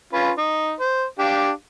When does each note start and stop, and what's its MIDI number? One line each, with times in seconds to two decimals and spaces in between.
0.13 0.30 61
0.13 0.30 65
0.13 0.30 71
0.38 0.74 63
0.80 1.04 72
1.19 1.50 62
1.19 1.50 67
1.19 1.50 77